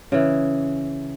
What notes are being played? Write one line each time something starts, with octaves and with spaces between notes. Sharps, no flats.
C#3 E3